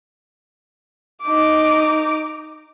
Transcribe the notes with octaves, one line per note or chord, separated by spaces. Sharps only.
D#4 D6